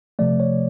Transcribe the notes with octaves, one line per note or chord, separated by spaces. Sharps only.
C3 F3 A3 D5
C#5